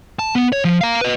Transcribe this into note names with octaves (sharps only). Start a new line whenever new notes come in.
A5
B3
C#5
F3
F5 A#5
B4 D#5